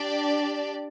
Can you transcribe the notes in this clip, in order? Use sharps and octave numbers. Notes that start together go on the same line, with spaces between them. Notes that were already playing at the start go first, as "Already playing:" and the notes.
Already playing: D4 G4 D5